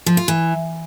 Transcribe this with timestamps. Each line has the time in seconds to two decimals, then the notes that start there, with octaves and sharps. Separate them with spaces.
0.06 F3
0.17 F4
0.28 E3